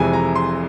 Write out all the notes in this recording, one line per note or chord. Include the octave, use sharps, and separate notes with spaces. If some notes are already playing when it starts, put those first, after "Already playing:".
Already playing: F1 F2 C3 E3 G#3 G#5
A#5
C6